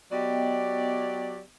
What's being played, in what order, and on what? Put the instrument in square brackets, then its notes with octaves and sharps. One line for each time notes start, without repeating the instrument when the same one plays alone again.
[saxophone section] F#3 G4 D5 [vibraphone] B3 D#5 G5